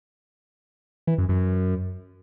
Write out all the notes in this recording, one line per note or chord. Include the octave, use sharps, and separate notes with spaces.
E3
F#2
F#2